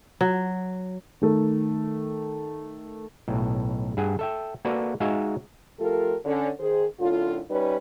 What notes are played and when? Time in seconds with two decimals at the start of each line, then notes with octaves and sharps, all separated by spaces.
0.21 F#3
1.22 D#3 A3 A4
3.28 B1 A2
3.97 G2 G#4 F#5 G#5
4.19 A4 E5 G5
4.65 A#3 F#4 A4 B4 D5
5.00 G#3 D#4 F#4 E5 F5 G#5
5.79 F3 A3 F4 G4 A4 A#4
6.25 D3 C#4
6.59 D#3 G#4 C5
7.00 F#2 A2 D3 F4
7.50 G3 C#4 D#4 B4